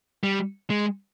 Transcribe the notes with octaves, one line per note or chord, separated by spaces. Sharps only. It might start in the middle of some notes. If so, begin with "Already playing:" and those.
G3
G#3